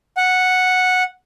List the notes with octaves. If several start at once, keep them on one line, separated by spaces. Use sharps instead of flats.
F#5